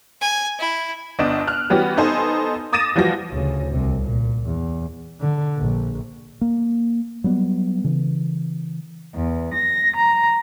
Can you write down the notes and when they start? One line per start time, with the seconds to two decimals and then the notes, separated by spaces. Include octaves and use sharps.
0.21 G#5
0.59 E4
1.19 G1 D4 D#5 D7 E7
1.47 F6 F#6
1.70 E3 G3 B3 C#4 F#4 G4
1.97 B3 D#4 A4 C5 G#5
2.73 D6 D#6 A6 A#6 D#7 E7
2.95 E3 F3 G3 F#4 A#6
3.30 D2 C#3
3.72 C2 C3
4.02 A#2
4.46 E2
5.20 D3
5.58 A#1
6.41 A#3
7.24 F#3 G3 B3
7.84 C#3 E3
9.15 E2
9.55 A#6
9.97 A#5